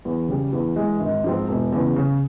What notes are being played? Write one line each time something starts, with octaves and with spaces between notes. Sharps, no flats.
E2
C#3 G3
E2
E3 G#3
G#1
G#2 F3 C4
E1
E2 C#3
C#3